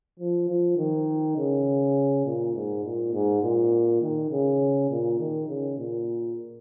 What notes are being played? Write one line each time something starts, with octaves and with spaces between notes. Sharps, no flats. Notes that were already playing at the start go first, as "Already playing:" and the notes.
F3
F3
D#3
C#3
A#2
G#2
A#2
G#2
A#2
D#3
C#3
A#2
D#3
C#3
A#2